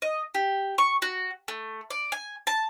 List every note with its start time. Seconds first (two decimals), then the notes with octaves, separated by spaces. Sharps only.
0.02 D#5
0.35 G4
0.78 C#6
1.02 F#4
1.48 A3
1.90 D5
2.12 G#5
2.47 A5